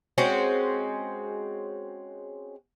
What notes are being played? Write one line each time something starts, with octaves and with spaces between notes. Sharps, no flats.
G#3 C4 C#4 F#4